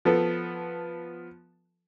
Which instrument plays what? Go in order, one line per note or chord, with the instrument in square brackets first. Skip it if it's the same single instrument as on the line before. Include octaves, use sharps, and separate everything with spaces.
[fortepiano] F3 B3 A4